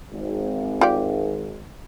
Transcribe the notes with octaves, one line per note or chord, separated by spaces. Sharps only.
G#1
F4 G4 D5